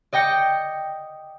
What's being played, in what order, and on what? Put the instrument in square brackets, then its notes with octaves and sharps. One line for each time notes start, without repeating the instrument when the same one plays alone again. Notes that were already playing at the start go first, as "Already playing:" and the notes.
[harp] D5 D#5 G5 A#6 C#7